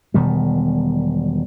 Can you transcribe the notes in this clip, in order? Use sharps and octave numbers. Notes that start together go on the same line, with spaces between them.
E1 B2 D#3 G3